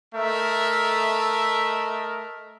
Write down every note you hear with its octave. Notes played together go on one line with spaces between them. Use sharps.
A3 A#4 D#5 E5